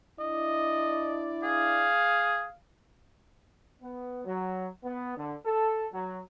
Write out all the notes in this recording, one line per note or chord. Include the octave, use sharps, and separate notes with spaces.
D4 E4 D5 D#5
G#4 F5
B3
F#3
B3
D3
A4
F#3